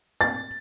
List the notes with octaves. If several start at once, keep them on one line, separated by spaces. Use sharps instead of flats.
A6